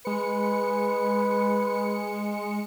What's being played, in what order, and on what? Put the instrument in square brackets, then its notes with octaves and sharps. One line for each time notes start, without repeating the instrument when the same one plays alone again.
[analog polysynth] G#3 C#7 [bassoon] B4